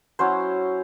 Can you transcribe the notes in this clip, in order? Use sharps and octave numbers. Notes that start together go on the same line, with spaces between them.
F#3 C#4 E4 C5